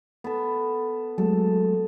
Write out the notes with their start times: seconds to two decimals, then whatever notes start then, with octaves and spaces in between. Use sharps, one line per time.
0.24 B3 A4
1.18 F#3 G#3 A3 A4